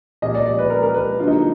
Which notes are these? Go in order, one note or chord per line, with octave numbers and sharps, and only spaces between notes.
A#2 F3 G#3 D#5
D5
D5
B4
A#4
A#4
B4
D3 F#3 A#3 F4
D#4